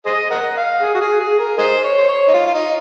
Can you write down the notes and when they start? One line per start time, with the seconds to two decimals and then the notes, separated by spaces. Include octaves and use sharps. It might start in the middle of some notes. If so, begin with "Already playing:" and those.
0.06 G#4 C5 D#5
0.31 A#4 D#5 F#5
0.57 F5
0.82 G#4
0.95 F#4
1.01 G#4
1.20 G#4
1.39 A#4
1.58 D#4 G#4 C5
1.84 C#5
1.98 C5
2.08 C#5
2.28 D#4
2.34 F4
2.46 F4
2.54 D#4